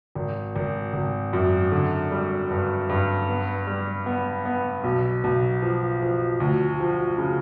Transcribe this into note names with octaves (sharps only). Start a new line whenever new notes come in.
G#1
G#1
G#1
F#2
D3
G3
G2
G2
B3
G3
B3
B3
B1
B1
F3
F3
D2
F3
C#3